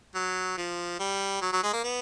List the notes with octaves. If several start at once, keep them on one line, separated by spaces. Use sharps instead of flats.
F#3
F3
G3
F#3
F#3
G#3
A#3
B3